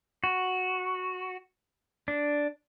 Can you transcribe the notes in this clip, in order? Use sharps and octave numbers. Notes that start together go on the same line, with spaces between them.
F#4
D4